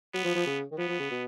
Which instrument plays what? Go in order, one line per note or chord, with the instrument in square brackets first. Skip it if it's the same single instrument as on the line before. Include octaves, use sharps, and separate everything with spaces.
[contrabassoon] F#3 [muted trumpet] B3
[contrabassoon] F3
F3
C#3
D#3
[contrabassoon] F3 [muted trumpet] B3
[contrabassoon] F3
C#3
B2